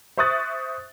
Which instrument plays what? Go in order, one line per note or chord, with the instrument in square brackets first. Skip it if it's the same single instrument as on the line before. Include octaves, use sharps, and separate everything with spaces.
[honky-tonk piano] C5 E5 C#6 D#6 F#6 A6